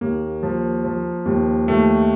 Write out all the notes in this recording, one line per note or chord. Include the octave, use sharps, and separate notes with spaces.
D#2 A#3
F3
F3
D#2
D#2 A3